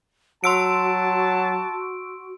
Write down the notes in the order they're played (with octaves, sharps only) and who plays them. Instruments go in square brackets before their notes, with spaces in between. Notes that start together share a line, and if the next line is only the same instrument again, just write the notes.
[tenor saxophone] F#3 [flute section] F#4 [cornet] A5 [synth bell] C6 E6 D7